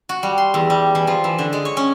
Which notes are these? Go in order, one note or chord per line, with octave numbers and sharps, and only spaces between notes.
F#4
G3
C6
E2
G3
E3
F3
E3
D3
G#3
C#5
C#4